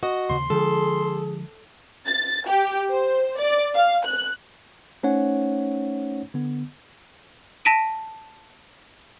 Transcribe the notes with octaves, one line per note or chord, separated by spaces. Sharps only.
F#4 D#5
D#2 C#3 C6
D3 F3 G#3 G#4 A4
A6
G4
C5
D5
F5
F#6
A3 C#4 D#4 C5 C#5 F#5
D3 B3
A5 A#6 B6 D7 D#7